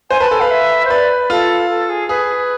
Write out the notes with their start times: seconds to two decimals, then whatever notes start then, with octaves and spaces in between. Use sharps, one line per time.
0.10 C5 G#5
0.20 B4 A5
0.31 A4 G#5
0.40 B4 F5
0.51 E5
0.85 C5
0.90 B4 D5
1.30 F4 A4
1.69 A4
1.89 G#4
2.09 G#4 B4